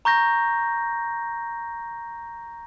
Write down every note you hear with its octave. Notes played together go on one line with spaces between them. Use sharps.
A#5 C#6 G6 A#6